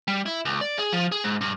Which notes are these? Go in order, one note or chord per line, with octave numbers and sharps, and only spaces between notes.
G3
E4
C#2
D5
G#4
F3
G#4
G#2
G2